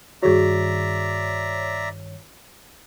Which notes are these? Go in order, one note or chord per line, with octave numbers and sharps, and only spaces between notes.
G2 D#3 F#4 G#4 C#5 D5 E5 A#5